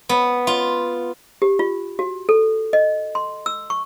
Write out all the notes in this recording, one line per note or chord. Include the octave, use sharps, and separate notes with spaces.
B3
F4
G4
F4
F#4
A4
D#5
C6
E6
C#6